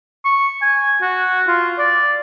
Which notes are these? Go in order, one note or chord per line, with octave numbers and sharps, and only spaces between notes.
C#6
G#5
F#4
F4
D5